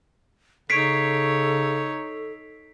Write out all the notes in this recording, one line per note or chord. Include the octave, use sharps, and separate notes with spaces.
C#3 D#4 A4 C#5 B6 C7 D7